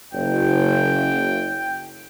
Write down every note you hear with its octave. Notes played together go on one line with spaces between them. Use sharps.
F#1 G5